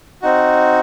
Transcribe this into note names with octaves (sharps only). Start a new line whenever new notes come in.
C4 D#4 F#4